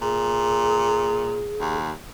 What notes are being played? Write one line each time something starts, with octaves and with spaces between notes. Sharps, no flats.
A#2 G#4
D#2